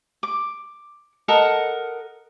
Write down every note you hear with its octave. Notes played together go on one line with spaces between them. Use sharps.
D6
A4 A#4 D#5 F#5